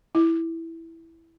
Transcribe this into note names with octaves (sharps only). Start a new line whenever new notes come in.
E4